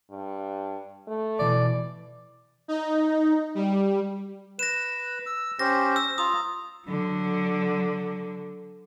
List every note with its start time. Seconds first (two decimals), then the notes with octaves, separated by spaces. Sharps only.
0.10 G2
1.08 A3
1.39 B2 E3 D5
2.68 D#4
3.55 G3
4.59 B4 A#6 E7
5.26 E6
5.59 C#4 G4 C5 A#6
5.96 E6
6.18 F4 A#5 D#6
6.86 D3 F#3